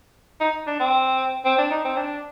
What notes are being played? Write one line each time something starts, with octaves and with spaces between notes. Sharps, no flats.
D#4
D4
C4
C4
D4
D#4
C4
D4